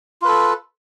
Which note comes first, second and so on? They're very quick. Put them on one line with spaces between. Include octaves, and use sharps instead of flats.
F4 B4 A4